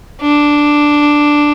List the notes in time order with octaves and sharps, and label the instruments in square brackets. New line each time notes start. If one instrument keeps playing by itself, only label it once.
[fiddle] D4